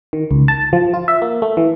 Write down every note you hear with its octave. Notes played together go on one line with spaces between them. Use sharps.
D#3
C#2
A5
F3
F4
E5
A#3
A3
E3